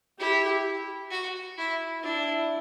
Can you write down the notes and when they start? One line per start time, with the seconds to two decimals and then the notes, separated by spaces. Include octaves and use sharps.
0.19 E4 G4
1.11 F#4
1.58 E4
2.03 D4 E4